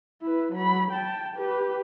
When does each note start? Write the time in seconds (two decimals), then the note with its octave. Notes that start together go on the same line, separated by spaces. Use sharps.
0.22 E4 B4
0.53 F#3 B5
0.92 G5 A5
1.36 G4 B4